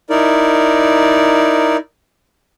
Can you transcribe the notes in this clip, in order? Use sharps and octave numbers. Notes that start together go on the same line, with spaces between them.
D#4 E4 A#4 D5